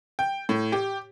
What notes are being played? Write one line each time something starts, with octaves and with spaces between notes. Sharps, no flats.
G5
A2
G4